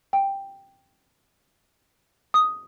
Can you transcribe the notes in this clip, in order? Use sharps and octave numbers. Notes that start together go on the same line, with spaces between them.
G5
D#6